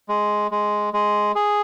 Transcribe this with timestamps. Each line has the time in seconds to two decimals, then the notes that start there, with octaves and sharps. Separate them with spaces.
0.09 G#3
0.51 G#3
0.94 G#3
1.35 G#4